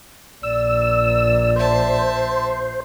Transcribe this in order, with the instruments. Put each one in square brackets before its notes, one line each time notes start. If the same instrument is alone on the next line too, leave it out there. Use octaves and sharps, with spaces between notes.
[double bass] A#1 [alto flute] D5 [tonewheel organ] E6
[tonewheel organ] C5 [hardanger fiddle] E5 A5